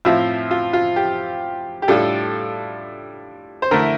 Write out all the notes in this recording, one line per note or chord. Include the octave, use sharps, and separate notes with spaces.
A2 F3 C4 F4 E5
F4
F4
G4
G4
A2 G3 D4 F4 A4
C5
D3 A3 E4 A#4